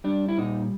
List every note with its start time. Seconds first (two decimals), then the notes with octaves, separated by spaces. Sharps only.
0.04 G3 D4
0.29 E4
0.38 A#2 D#4